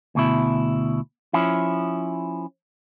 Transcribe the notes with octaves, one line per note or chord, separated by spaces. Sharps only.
D2 B2 E4
F3 C#4 E4